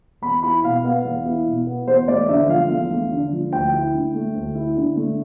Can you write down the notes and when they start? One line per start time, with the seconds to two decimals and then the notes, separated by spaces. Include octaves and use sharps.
0.22 E2 B5
0.43 E4 B5
0.64 B2 F5
0.84 B3 F5
1.05 E2
1.26 E4
1.47 B2
1.67 B3
1.87 E2 C5
2.08 A3 D5
2.29 D3 E5
2.49 F3 F5
2.69 E2
2.90 A3
3.12 D3
3.32 F3
3.52 D2 G5
3.72 E4
3.94 D3
4.14 A3
4.35 D2
4.55 E4
4.77 D3
4.96 A3